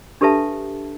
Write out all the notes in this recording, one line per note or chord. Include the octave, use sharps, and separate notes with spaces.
D4 G4 A4 B4 E5 A5